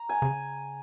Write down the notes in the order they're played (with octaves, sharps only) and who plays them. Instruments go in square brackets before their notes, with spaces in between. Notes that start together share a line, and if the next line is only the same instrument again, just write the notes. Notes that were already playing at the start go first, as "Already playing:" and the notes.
Already playing: [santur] A#5
G#5
[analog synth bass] C#3